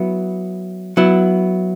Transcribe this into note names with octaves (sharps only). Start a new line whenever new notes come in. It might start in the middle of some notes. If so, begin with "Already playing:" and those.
Already playing: F#3 B3 E4
F#3 B3 E4